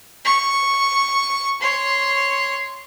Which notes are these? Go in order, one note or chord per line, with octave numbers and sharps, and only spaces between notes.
C#6
C#5 C6